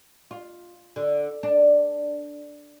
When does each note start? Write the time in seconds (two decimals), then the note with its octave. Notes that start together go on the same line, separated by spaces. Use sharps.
0.31 F4
0.96 D3
1.43 D4